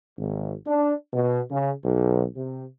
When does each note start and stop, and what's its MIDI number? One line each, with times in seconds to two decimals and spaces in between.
0.18 0.52 32
0.66 0.94 62
1.12 1.40 47
1.51 1.71 49
1.84 2.24 35
2.36 2.66 48